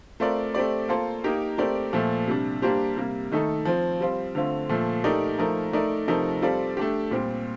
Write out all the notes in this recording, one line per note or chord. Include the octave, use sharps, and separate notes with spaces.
A3 C4 F4 A#4 D5
A3 C4 G4 D5
A#3 F4 A4 C5
A#3 D#4 G4 A#4
A3 C4 G4 A#4 D5
A#2 F3 A3
C3 G3 D4
G3 A#3 D4 G4 C5
C3 G3 A#3
D#3 A3 D#4 A4
F3 C4 F4
G3 C4 F4
D3 A3 C4 F4
A#2 F3 A3
A3 D#4 G4 A#4 D5
F3 A3 D#4 A#4
A3 D#4 A#4 D5
C3 F3 A3 D#4 A#4
G3 C4 F4 A4 D5
A3 D4 G4
A#2 G3 C4 G4